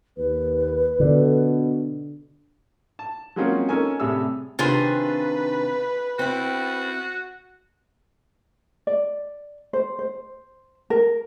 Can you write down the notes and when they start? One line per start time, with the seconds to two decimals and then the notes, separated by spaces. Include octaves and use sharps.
0.17 D#2 B4
1.00 B2 D3
2.99 A5
3.36 F#3 G#3 A#3 C4 C#4 F4
3.69 C#4 D#4 A4 A#4 G#5
4.00 A2 C3 G3 G#4 E6
4.59 C3 D#3 D4 F4 G#4 B4 C5
6.19 C4 E4 F#4
8.87 D5
9.73 C5
9.99 C5
10.90 A#4